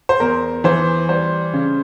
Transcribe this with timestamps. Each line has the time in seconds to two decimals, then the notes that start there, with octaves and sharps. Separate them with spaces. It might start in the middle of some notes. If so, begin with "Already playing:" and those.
0.09 C5
0.20 E2 A#4
0.64 E3 C5
1.09 G3 C5
1.53 C#3